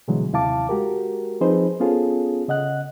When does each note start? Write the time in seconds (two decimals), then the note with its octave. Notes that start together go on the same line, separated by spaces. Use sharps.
0.08 B2 D3 E3 F#3 G#3
0.33 D#2 C3 E4 F5 A5 D6
0.69 G#3 F#4 G4 A#4
1.41 F3 C4 D#4 G#4 B4 C5
1.80 B3 C#4 F4 G#4 A4
2.48 C#3 D#5 F#5 F#6